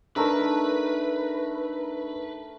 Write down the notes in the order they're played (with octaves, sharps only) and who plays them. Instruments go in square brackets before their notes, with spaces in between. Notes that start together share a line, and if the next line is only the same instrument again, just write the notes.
[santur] A3 A#4 E5 [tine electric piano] D4 D#4 [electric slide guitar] B4